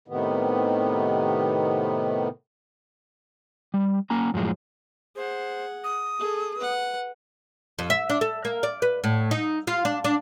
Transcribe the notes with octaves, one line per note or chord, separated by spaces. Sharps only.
A2 C3 D#3 B3
G3
A#3 C#4 A#5
F#2 A2 F3 G#3
G#4 C5 F#5
D#6
G#4 A4
B4 F#5
F2
E5
D4
A4
A#3
D5
B4
A2
D#4
F4
D4
D4